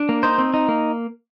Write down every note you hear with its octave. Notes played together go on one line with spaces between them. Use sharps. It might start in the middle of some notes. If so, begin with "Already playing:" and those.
Already playing: D4
A#3
D#4 C5
C4
D#4
A#3